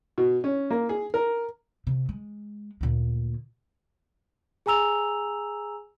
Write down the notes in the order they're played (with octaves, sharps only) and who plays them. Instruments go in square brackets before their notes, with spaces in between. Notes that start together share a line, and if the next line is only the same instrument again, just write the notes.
[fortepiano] B2
C#4
A#3
G#4
A#4
[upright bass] C3
G#3
D2 A#2
[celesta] G#4 G#5 A#5 E6 F7